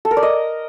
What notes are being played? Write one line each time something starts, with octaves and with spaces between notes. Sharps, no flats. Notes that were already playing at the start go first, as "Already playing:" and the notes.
A4
A#4
D5
D#5